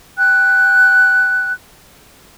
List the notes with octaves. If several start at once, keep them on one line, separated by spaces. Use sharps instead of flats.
G5 F#6